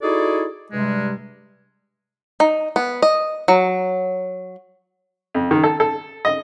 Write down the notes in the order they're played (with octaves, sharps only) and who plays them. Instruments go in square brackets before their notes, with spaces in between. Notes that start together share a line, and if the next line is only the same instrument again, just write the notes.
[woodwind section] D#4 E4 F#4 G#4 A4 D5
G2 C3 G3 G#3
[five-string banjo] D#4
B3
D#5
F#3
[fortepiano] F2
D#3
A4
A4
D#5